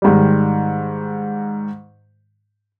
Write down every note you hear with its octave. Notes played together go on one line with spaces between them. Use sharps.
G#2 D#3 G3